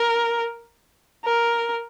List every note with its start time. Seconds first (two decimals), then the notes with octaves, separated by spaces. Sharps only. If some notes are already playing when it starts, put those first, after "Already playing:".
Already playing: A#4
1.25 A#4